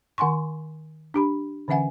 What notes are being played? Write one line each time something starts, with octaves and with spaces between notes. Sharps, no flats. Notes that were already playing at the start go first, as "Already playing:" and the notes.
D#3 F#5 G#5 C6 C#6
D4 G4 B5
D3 E3 C#4 E5 F#5 G#5